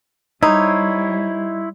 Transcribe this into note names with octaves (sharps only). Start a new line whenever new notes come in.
G3 D#4 E4 C5 C#5